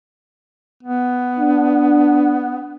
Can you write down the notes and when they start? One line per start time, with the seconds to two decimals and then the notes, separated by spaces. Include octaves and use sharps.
0.83 B3
1.39 D4